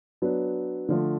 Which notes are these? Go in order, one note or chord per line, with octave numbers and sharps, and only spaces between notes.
F#3 B3 D4
D3 F3 A3